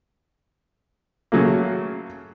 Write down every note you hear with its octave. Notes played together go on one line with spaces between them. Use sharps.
C#3 F#3 A3 A#3